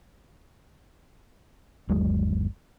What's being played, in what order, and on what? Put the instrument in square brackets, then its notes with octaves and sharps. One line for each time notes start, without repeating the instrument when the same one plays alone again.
[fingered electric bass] G1 D#2 F#3 G#3